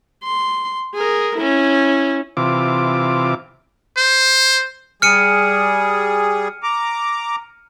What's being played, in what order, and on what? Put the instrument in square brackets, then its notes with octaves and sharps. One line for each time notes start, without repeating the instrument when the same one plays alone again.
[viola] C6
G#4 A#4
C#4 E4
[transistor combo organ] C3 E3 F4 D6
[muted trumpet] C5
[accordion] G3 G#4 [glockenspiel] F6 C#7 D#7
[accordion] A#5 D6